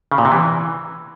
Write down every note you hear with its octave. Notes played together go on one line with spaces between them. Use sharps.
C#3
A#2
C3
E3